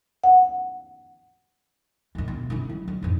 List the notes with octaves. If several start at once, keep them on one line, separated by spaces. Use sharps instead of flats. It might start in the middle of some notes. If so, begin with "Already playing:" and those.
F#5
E2 A2
B2
C#4 E4
F#3
D3
F2 G#2